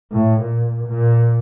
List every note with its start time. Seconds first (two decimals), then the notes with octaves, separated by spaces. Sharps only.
0.12 A2
0.41 A#2
0.88 A#2